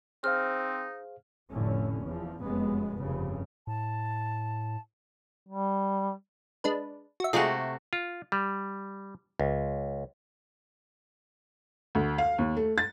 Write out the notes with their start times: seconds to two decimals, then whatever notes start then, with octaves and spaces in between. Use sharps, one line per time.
0.24 C4 D#4 G#4 C5 F5 F6
1.52 F1 A2 D3 C#4
2.05 E2 F3
2.43 F1 F#2 G#3 B3
2.99 F1 G2 C#3
3.67 A2 A5
5.49 G3
6.64 G#3 D4 B4
7.20 F#4 E5
7.33 C3 G#3 A3 F4 F#4 G#4
7.93 F4
8.32 G3
9.40 C#2
11.95 D2
12.18 F5
12.38 D#2
12.57 A3
12.78 A6